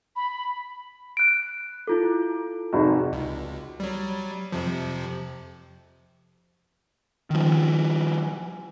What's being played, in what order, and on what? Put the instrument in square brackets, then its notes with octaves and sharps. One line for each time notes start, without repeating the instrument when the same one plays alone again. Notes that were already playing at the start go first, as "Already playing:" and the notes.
[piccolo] B5
[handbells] F#6 D7
E4 F4 A4
[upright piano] F1 G#2 F#4
[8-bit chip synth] C#2
F#3 G3
F2 C3 F3
[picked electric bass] D#3 F3